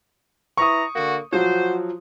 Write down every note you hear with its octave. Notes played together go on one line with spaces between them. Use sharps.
E4 B4 A#5 C#6 D#6
D3 A#3 F#4
F3 F#3 F#4 C5